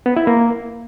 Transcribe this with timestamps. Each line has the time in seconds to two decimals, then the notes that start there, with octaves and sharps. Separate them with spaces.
0.06 B3
0.17 E4
0.27 A#3